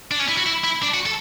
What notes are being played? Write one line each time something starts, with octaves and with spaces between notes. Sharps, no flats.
D4
C#4
E4
F#4
E4
E4
D4
F#4
A4